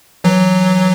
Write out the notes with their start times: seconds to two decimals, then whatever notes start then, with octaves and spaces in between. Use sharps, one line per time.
0.24 E3 F#3